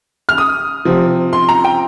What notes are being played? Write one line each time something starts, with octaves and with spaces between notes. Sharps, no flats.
F6
D#6
C3 F3 C4
C6
A#5
G5